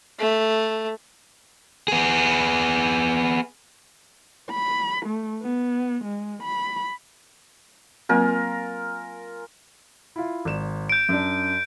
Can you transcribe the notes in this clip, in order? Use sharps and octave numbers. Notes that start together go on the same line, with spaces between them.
A3
B3 G#4
B5
A3
B3
G#3
B5
F#3 A#3 C4 F4 A#4 G#5
E4 F4
G#1 D5 E7
G6 D7
F#2 D4